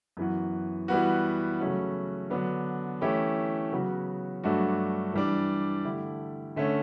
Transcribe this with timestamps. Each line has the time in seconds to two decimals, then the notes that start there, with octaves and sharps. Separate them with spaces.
0.17 F#2 E3 B3 F#4
0.88 E3 G3 B3 F#4
1.59 C#3 F#3 A3 C#4 F#4
2.30 D3 F#3 B3 D4
3.01 E3 A3 C#4 E4 G4
3.72 C#3 F#3 B3 F#4
4.43 G2 F#3 A3 D4 F#4
5.13 E3 G3 D4
5.85 D3 A3 E4 G4
6.56 D3 A3 C#4